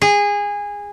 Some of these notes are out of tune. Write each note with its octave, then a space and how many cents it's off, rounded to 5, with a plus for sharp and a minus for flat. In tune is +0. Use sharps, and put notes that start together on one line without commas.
G#4 -20